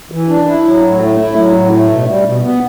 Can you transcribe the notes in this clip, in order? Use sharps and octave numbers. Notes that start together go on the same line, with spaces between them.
E3
D4
E4
F#3
A2
A3
E4
F#3
A2
A3
B2
G3
B2
B3